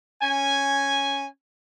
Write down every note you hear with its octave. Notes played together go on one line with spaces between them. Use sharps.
C#4 G#5